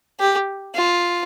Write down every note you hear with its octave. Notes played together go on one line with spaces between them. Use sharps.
G4
F4